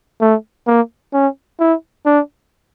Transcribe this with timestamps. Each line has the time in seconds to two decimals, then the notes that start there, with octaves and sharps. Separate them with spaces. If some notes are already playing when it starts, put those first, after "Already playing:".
0.21 A3
0.67 A#3
1.13 C#4
1.59 E4
2.06 D4